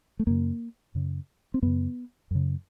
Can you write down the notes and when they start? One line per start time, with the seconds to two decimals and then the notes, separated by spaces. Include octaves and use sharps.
0.19 A3
0.27 F#2 C#3 A#3
0.95 F#2 C#3
1.54 C4
1.62 F#2 C#3 B3
2.31 F#2 C#3